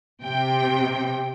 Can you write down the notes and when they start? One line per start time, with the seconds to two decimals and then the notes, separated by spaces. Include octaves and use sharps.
0.23 C3 G5